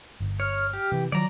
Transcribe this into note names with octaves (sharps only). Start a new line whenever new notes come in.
G1
C#5 F6
G4
C3 E3
D#3 F3 F#3 D5 A#5